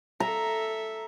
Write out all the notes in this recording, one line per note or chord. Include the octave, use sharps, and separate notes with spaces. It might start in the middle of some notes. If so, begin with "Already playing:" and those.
A4 E5 A#5